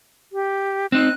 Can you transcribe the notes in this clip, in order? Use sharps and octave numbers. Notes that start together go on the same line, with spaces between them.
G4
C4 D#4 F#6